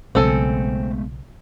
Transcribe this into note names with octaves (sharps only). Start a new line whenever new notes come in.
B1 C#3 G#3 A3 B3 C4 A4 G#5